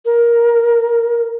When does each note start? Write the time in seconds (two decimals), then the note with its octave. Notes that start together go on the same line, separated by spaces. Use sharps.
0.05 A#4